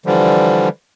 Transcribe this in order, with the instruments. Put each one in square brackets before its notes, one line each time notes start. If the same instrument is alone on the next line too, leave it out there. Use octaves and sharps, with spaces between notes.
[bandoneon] D3 E3 F3 G3